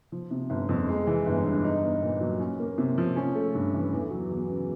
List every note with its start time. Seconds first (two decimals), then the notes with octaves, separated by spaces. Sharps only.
0.12 F3
0.31 C3
0.50 G1
0.69 F2
0.88 G#3
1.07 E3
1.26 G1
1.45 G2
1.65 D#4
1.83 B3
2.02 A#2
2.21 F#3
2.40 C#4
2.60 A#3
2.78 C3
2.98 F3
3.16 C#4
3.35 A3
3.54 G2
3.74 E3
3.92 E2
4.11 F#3
4.30 E2
4.49 C#3